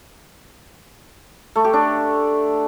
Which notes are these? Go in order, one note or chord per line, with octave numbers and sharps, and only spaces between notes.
A3
G4
D4